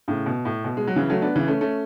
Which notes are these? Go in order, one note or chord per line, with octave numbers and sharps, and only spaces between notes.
A2 C#3
B2
A2
B2
G#3
F#3
C#3 E3
F#3 A3
B3 D4
C#3 E3
A3 C#4
A3 C#4